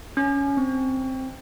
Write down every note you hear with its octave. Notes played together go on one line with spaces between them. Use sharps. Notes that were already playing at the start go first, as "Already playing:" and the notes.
C#4
C4